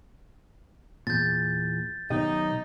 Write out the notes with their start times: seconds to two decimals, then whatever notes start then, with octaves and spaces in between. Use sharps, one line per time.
1.07 E2 A#2 G6 A6
2.10 B2 D#3 F#3 D#4 G4 D#5